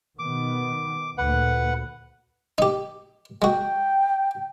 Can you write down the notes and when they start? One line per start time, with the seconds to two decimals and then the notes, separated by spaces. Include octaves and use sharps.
0.19 B2 D#3 B3 D6
1.18 D2 A#2 B4 F#5
2.58 D#4 G4
3.42 G#3 F#4 G5